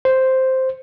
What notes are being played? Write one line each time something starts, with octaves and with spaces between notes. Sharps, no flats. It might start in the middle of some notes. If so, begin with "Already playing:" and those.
C5